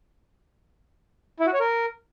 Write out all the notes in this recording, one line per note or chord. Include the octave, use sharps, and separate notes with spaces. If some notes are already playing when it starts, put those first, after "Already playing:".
E4
F#4
C#5
A#4